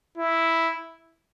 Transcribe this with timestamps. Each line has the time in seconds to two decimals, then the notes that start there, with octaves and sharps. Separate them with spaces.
0.17 E4